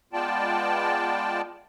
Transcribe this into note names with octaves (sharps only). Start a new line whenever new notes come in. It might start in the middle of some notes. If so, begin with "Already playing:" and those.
G#3 B3 F4 D5 G5 A5